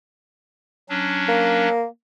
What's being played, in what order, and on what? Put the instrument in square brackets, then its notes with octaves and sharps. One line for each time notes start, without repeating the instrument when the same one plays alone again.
[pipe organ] F#3 C#4 D4
[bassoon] A#3